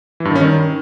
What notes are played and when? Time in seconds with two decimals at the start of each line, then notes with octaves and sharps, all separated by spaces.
0.20 E3
0.25 G2
0.30 D#3
0.36 C#4
0.41 D#3